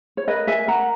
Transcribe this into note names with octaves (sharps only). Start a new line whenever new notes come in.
C#5
A#4 B4 D#5
E5 G#5
A#4 F#5 A#5